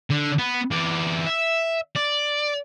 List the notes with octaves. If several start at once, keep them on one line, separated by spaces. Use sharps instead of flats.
D3
B3
E3 D5
E5
D5